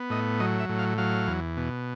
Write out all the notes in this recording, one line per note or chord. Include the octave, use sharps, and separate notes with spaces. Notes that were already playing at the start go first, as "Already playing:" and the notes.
Already playing: B3
A2 D#5
F#3 D#5
E5
A2
F5
F#3 F5
E2
B2